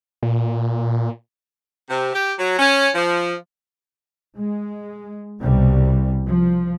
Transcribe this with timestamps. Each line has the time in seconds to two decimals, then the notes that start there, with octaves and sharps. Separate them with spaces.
0.23 A#2
1.90 C3
2.13 G4
2.39 F#3
2.59 C#4
2.95 F3
4.37 G#3
5.41 C2 B2 G3
6.28 F3